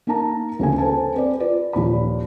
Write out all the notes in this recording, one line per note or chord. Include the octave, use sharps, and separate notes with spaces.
A#3 D#4 A#4 A5 A#5
D2 C#3 A#3 G#5
A4 B4 C5 G#5 A5
C4 B4 D5
F4 B4 D5
D#2 A#2 F3 B5